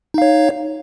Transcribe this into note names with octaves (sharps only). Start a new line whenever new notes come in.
D#4 C#5 F5